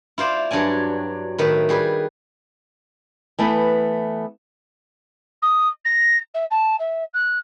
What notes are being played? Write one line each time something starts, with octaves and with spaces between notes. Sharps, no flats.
E4 F4 C5 D5
G2 F#3 D4 D5 G#5
A2 D#3 B4
G3 G#4 B4
E3 A3 B3 A4 B4
D#6
A#6
E5
A5
E5
F#6